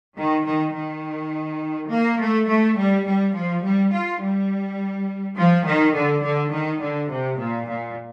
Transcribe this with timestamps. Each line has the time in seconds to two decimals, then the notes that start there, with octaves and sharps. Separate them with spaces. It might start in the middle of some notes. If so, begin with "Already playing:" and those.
0.17 D#3
0.45 D#3
0.75 D#3
1.90 A#3
2.19 A3
2.48 A3
2.77 G3
3.05 G3
3.34 F3
3.63 G3
3.93 F4
4.21 G3
5.37 F3
5.66 D#3
5.95 D3
6.23 D3
6.52 D#3
6.81 D3
7.10 C3
7.39 A#2
7.68 A#2